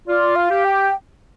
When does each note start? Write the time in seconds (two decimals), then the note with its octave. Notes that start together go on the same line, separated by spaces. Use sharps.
0.08 F4 D5
0.36 F5
0.50 G4
0.65 G5